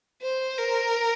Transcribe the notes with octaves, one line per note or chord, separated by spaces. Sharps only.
C5
A#4